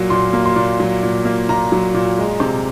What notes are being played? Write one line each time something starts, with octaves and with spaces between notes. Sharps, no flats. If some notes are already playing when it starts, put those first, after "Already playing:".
Already playing: A#2 F#3 A#3
A#2 C6
A#3
C6
A#2
F#3
A#2
A#3
A#2 A#5
F#3
A#2
G#3
C3